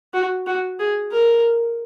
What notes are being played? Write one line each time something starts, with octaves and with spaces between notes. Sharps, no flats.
F#4
F#4
G#4
A#4